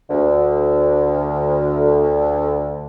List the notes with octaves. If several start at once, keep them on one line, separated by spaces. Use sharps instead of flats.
D2 D3